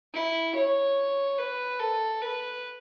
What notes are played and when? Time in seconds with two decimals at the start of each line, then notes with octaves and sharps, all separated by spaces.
0.14 E4
0.55 C#5
1.38 B4
1.80 A4
2.22 B4